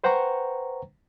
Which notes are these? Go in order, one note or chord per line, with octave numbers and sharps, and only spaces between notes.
B4 C5 F#5 G5 A#5 C#6